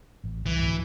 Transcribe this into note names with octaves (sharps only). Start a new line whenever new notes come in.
A1
C2 E3
G#1 D2 B2